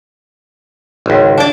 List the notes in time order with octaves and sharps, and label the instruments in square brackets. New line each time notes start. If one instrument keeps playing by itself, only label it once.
[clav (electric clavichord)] G#1 C#2
[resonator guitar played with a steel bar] D4 D5